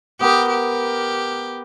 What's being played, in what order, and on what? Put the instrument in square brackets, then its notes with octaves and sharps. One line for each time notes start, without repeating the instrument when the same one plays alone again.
[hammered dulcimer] B3 A#4 [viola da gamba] G4
[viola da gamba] G4